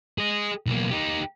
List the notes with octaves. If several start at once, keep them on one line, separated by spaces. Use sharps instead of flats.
G#4 D#5
B1 A#3
D#4 G4